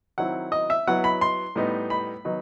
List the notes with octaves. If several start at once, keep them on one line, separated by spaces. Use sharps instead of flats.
D#3 F#3 C4 E4 F#5
D#5
E5
F#3 B3 E4 F#5
B5
C6
A2 G3 B3 D#4
B5
D#3 F#3 B3 D#4